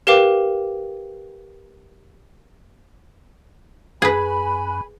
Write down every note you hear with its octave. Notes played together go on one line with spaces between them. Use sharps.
G4 A#4 B4 F5 G5 D6
F#2 G#4 B4 G#5 B5